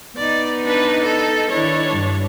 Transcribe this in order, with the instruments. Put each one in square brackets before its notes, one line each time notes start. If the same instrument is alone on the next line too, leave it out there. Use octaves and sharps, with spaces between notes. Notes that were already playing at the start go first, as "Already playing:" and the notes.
[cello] B3 D#4 [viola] D5
[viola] D4 B4
A4
[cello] D#3 E4 [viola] D4 C#5
[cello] G2